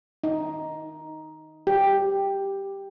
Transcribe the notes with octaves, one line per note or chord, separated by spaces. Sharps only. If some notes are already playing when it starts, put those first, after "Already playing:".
D#4
G4